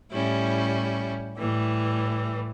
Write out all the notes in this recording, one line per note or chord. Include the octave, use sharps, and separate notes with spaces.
A2 G3 C#4 E4
A2 E3 G3